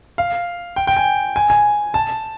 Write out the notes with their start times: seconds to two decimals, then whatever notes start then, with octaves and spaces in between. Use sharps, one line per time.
0.18 F5
0.76 G5
0.87 G5
0.97 G#5
1.36 G#5
1.50 G#5
1.94 A5